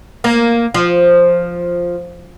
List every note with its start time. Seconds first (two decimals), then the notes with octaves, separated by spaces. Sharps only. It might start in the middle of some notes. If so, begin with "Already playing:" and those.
0.24 A#3
0.74 F3